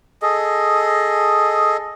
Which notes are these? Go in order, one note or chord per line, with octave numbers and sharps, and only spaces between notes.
G#4 A4 D#5